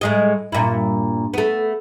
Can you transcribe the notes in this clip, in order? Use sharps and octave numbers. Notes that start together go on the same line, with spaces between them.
A2 G#3 D#5
G2 A#2 E4
A3 B3